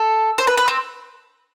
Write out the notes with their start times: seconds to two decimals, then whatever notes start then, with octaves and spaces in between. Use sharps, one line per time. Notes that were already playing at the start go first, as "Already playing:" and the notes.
Already playing: A4
0.38 C5
0.47 B4
0.57 B4
0.68 C4